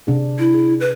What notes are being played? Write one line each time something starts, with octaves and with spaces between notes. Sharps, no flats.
C3 D4 G#4
E4
G#4
B4